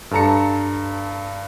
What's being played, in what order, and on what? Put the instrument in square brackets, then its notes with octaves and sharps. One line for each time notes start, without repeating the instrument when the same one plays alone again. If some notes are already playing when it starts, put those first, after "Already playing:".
[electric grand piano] G2 A4 A5 A#5 C#7